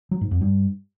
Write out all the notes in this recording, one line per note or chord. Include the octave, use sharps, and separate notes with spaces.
F#3
G#2
F2
G2